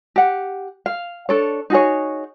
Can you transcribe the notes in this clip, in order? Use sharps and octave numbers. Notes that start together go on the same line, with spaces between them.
G4 F#5
F5
D4 A4 C#5
D#4 F#4 G#4 C#5